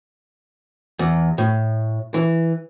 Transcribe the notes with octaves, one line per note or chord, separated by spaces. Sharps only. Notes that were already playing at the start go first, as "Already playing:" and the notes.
E2
A2
E3